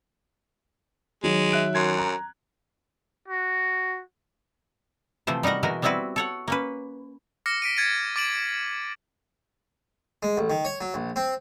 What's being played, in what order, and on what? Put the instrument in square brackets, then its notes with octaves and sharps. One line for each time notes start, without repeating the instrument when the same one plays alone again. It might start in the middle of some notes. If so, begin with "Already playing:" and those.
[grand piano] D#3 F#3 [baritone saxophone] G#3
[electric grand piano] E5 F#6 D7
[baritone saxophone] F#2 [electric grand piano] C6 G#6
[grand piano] A#5
[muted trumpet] F#4
[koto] C3 E3 F3 A3 C5
G3 D#4 F#4 A#4 F#5
B2 E3 G#3 F#4 A#4
G3 B3 C4 E4 F#4 B4
A4 C#5 F#5
A#3 C#4 B4
[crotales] D6 F6 A#6 C#7
B6 D7 D#7
G#6 A6 C#7 D#7
D6 A6 D7 D#7 F#7
[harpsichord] G#3
A1
D#3
C#5
F#3
A#1
C4